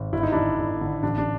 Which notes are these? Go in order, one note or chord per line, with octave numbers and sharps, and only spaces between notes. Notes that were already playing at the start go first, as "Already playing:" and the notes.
Already playing: G#1
G1 E4
D#4
G1 D4 E4
G1
D3
A1 D4
D4